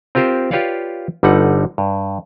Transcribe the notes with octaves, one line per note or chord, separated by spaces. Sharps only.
C4 F4 G4 A#4 C5
F4 G4 B4 C#5 D5 F5
G1 D3 G3 D#4 F#5
G2